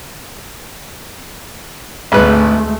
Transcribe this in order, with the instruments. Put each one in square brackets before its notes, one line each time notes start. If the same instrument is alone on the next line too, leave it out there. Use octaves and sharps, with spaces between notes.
[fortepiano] G#1 B4 [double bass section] D2 G#3 A3